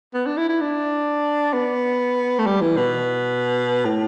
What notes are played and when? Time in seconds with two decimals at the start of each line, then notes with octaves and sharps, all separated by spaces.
0.14 B3
0.26 D4
0.37 E4
0.49 E4
0.61 D4
1.53 B3
2.39 A3
2.46 G3
2.61 E3
2.77 B2
3.85 A2